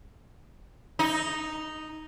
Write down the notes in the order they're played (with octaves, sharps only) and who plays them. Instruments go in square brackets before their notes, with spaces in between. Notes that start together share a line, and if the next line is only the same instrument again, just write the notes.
[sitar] D#4